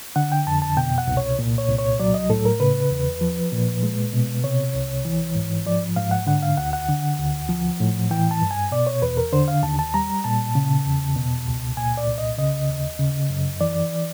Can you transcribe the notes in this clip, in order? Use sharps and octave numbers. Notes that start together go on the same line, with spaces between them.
D3 F#5
G5
F2 A5
A5
B2 G5
F#5
C2
C#5
A#2
C#5
C2
C#5
F#3 D5
D#5
A2 A4
A#4
C#3 B4
E2
F3
A#2
G#3
B2
C3 C#5
C2
E3
G#2
F3 D5
G#2 F5
F#5
D3 F#5
F5
D2 F#5
F#5
D3
D2
F3
A2
E3 G5
A5
G2
G#5
B2 D5
C#5
E2 B4
A#4
D3 C5
F5
D#2 A5
A5
G3 A#5
A#2 A5
C#3
E2
B2
C#2
A#2 G#5
D5
C2
D#5
C#3 D#5
D#2
C#3
F#2
E3 D5